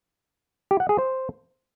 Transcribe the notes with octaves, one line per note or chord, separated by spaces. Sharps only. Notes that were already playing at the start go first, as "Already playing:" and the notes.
G4
F#5
G#4
C5